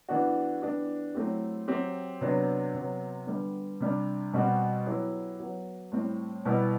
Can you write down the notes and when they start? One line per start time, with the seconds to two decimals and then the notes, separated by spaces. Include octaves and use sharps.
0.08 E3 B3 D4 F#4
0.62 E3 B3 D4 G4
1.14 F#3 A3 C4 E4 G4
1.68 F#3 C4 G4
2.21 C3 F#3 B3 D4
2.74 C3 F#3 B3
3.27 D3 G3 B3
3.80 C3 G3 D4
4.33 B2 G3 C4 F#4
4.86 F#3 B3 E4 G4
5.39 F#3 B3 F#4
5.92 A2 G3 C4
6.45 B2 G3 B3 E4